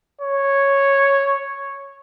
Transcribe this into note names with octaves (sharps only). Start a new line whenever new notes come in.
C#5